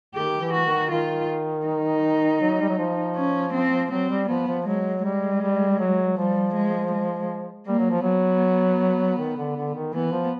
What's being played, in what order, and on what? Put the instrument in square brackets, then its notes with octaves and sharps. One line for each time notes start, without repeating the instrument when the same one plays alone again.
[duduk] D#3 [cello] G4
[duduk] E3
[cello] F#4
[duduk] D#3
[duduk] D#3 [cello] F4
[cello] D#4
[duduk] F#3
G3
F#3
F3
[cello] C#4
C4
[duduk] F#3 [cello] C4
[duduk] G3
[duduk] F3 [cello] B3
[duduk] F3
[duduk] F#3 [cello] G#3
[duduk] G3 [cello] G#3
[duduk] G3
F#3
[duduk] F3 [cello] G3
[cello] G#3
G#3
[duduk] G3 [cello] A#3
[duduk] F#3
F3
[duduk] F#3 [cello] B3
[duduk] D#3
D3
D3
D#3
[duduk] E3 [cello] B3
[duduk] F3